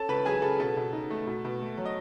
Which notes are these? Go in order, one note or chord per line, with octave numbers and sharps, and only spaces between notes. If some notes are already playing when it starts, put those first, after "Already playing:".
Already playing: C#4 A4 A5
C#2 B4 B5
F#3 G#4 G#5
C#3 A4
B2 A4
B2
D#4
A3
B2
B2
A3
F#3
D#5